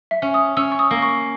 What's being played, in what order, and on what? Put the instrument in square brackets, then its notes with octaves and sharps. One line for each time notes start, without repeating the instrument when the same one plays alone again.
[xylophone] E5
[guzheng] C#4
[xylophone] D#6
[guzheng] C#4 [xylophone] E6
[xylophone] C#6
D#6
[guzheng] A#3
[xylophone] C#6